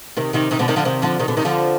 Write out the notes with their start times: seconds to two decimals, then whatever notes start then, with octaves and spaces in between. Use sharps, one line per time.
0.17 C3 D#3
0.33 C3 D#3
0.51 C3 D#3
0.59 B2 D3
0.68 C3 D#3
0.76 D3 F3
0.85 C3 D#3
1.02 D3 F3
1.19 C3 D#3
1.28 B2 D3
1.37 C3 D#3
1.45 D3 F3